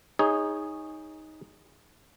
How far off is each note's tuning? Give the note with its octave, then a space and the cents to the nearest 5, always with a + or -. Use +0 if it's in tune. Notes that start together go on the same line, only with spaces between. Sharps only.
D#4 +10 G#4 -15 C#5 +0